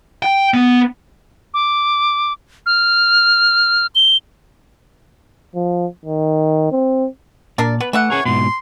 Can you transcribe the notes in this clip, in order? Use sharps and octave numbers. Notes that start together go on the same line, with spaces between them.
G5
B3
D6
F6
G7
F3
D#3
C4
A#2 D4 A#4 D5
B3 B4
E3 A3 E5 F#5
C#4 G#4 A#4 C#5
G#2 B2 C6